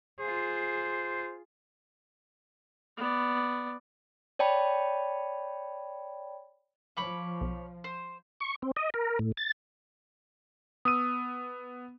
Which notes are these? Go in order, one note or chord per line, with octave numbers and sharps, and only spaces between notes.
F4 G#4 C5
B3 D5
C#5 D5 G5 A5 B5
F3 C#5 B5 D6
B1
C5
C#6
C4
D#5
A#4
A2
A6
B3 D#6 E6 D#7